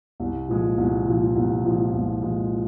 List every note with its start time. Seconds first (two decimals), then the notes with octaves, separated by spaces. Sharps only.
0.20 C2
0.48 A#2 F3 G#3
0.78 C2
1.06 A#2 F3 G#3
1.36 C2
1.65 A#2 F3 G#3
1.94 C2
2.23 A#2 F3 G#3